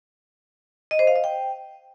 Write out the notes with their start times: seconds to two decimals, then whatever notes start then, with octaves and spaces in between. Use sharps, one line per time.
0.91 D#5
0.99 C5
1.07 F5
1.16 D#5
1.24 G5